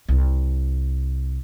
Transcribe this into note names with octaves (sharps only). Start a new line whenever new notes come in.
C2